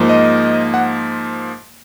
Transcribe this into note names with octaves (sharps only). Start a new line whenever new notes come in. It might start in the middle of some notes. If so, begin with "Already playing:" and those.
Already playing: G#2 F3 A#3
D#5
F#5